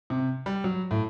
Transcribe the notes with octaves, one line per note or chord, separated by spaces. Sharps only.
C3
G3
F#3
A2